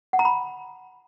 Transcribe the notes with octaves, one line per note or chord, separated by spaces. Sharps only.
F#5
A#5
B5